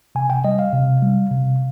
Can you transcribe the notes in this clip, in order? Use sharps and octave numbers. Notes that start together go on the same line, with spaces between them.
C3 G#5
G5
G3 D#5
F5
C3
G3
C3